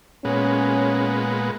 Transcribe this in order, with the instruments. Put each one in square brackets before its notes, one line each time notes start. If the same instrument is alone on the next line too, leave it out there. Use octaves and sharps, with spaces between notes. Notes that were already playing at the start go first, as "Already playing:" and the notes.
[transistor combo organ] A#2 G#3 B3 [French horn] C#4